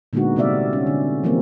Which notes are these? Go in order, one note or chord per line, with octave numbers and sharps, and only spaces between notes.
A#2 D3 G#3 B3 D#4 F#4
C3 G3 C4 D5 E5 F5
C#4
D3
E3 F3 G3 A#3 C4